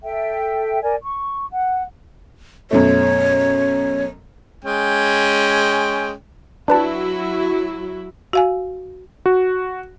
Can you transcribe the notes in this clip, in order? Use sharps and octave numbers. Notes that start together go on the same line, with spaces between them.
A4 E5 G5
A#4 D5 G#5
C#6
F#5
F#2 B2 A3 C#5
G#3 C#4 G5
F#3 D4 E4 F#4 B4 A5
F#4 F5 G#5
F#4